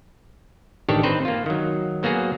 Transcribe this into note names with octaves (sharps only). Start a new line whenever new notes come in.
A1 D#3 D4 G4 A4 C#5
C4 D#4 B4 C5
A#3 F4
D#3 F#3
F#3 A#3 B3 F#4 G#4